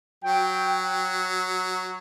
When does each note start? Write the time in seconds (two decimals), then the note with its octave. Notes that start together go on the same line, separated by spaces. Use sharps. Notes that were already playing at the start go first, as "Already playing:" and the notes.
0.23 F#3 G5